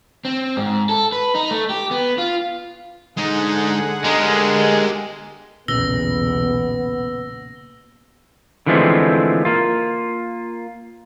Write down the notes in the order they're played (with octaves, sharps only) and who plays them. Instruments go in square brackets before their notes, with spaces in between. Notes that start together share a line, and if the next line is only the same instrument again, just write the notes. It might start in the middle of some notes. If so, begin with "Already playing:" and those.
[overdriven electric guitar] C4
G#2
A4
B4
D#4
A3
G4
B3
F4
[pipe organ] D3 G#4 F#5 [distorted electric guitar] G#3 D#4
[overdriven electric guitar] G#3 [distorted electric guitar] G4 A#4
[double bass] B1 E2 [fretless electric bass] A#2 C#3 [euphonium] B3 [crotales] E6 A#6 G7
[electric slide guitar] D3 E3 F3 G#3 A3 C4
A#3 F4